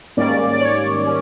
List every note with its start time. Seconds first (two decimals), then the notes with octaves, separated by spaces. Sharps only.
0.17 G#2 D#3 G3 A#3 C#4 D5
0.53 D5
0.61 C#5
1.06 C#4